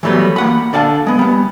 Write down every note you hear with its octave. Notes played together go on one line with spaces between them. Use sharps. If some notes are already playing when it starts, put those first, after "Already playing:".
E3 F#3 G3 A3 B3
A#3 F#5 B5
D3 D5 F5 F#5 A5
G#3 B3
G3 B3